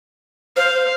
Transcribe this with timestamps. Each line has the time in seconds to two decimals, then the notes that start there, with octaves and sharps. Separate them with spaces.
0.56 C5 F5